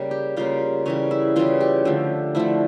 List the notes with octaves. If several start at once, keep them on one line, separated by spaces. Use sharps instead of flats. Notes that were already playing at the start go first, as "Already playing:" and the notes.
Already playing: C#3 G3 A#3
G4
C#3 G3 A#3 F4
C#3 E3 G3 C#4
E4
C#3 E3 G3 F4
G4
D3 F3 A3
D3 F3 A3 E4